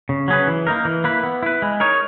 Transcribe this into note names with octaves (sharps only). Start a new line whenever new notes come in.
C#3
F#3 C#4 G#4 B4
E3
A#3 D#4 A#4
E3
A#3 E4 B4
B3
E4 B4
G#3
D#4 A#4 C#5